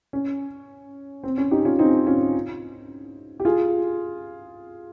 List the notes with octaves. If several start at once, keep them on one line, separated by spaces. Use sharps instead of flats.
C#4
C4
C#4
D#4 G4
C#4 F4
C4 D#4
C#4 F4
G4
F4 G#4